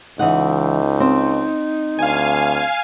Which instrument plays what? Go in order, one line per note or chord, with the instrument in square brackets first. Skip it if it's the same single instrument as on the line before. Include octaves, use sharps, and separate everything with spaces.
[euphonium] C#2 [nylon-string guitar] E3 D#5 F#5 [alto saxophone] D#4
[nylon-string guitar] C4
[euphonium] D2 [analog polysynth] F5 G#5